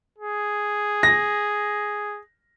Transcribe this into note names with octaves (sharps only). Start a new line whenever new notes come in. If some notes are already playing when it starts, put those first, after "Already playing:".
G#4
A#6